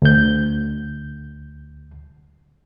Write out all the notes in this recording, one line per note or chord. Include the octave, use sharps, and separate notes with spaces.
D2 G6